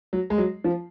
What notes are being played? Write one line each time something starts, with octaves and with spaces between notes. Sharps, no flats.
F#3
G#3
F#3
F3